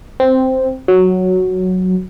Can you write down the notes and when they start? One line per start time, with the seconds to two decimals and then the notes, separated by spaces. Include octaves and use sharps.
0.20 C4
0.88 F#3